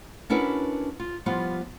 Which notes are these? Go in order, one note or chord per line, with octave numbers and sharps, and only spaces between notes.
C#4 D4 E4 F#4 A#4 B4
F4
F3 G3 B3 F4